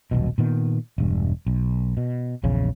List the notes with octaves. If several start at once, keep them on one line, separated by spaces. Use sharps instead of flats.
D#1 B1 B2
A#2 D#3 B3
E1 G2
B1
B2
A#1 E2 C#3